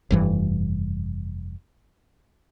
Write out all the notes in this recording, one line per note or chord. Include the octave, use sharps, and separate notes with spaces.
F1 G2 E3